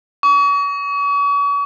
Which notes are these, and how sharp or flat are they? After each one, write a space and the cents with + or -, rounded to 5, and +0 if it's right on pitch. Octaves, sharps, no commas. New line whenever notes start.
C#6 +40